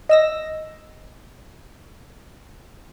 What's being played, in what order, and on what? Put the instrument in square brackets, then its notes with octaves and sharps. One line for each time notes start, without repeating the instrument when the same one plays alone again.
[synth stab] D#5 E6 A#6